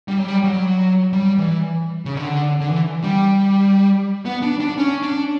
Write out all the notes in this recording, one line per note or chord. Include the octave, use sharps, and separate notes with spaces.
G3
F#3
G3
F#3
G3
E3
C#3
D3
D3
E3
G3
B3
D4
D4
C#4
D4